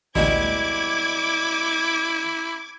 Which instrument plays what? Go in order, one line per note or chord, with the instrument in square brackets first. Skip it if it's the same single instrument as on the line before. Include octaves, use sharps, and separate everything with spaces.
[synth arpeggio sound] A1 D2 [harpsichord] B2 G3 G#3 [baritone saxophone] E4 [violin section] D6 G#6